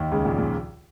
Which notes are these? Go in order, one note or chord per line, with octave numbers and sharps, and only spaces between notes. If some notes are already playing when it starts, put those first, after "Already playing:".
Already playing: D#2 D#3
C#2 C#3
A#1 A#2
A#2